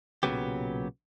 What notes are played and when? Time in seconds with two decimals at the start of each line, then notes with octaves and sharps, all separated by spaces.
0.23 B1 A#2 C#3 F#3 B3 G4